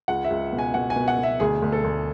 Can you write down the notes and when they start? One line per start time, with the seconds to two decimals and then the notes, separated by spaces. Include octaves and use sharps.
0.08 C#2 F#5
0.24 E5
0.30 C#2
0.53 B2
0.58 G#5
0.74 B2 F#5
0.90 G#5
0.96 B2
1.08 F#5
1.19 B2 E5
1.40 D2 G#4
1.62 D2
1.72 A4
1.84 D2